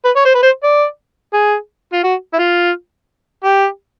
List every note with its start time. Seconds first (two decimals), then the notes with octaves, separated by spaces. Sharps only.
0.05 B4
0.16 C#5
0.25 C5
0.35 B4
0.43 C5
0.63 D5
1.33 G#4
1.93 F4
2.03 F#4
2.34 E4
2.39 F4
3.44 G4